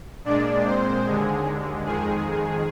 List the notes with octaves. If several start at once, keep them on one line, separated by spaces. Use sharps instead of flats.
A#2 G#3 D4 D5
C4 C5
D#2 D3 G#3 G#4
F2 D#3 G#3 G#4